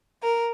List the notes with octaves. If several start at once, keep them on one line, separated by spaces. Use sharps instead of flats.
A#4